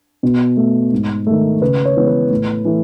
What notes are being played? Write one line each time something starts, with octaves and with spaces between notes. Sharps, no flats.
B2
A3
G#2
D#3 A3
C#3 B4
C#5
E3 G#3 B3
B4
A2
E3 A3